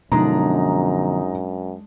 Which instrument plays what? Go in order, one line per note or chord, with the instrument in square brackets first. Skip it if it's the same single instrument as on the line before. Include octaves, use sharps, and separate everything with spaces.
[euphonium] F#2 [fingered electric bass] B2 D3 F3 [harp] G#3 D4 [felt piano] D#4 A#5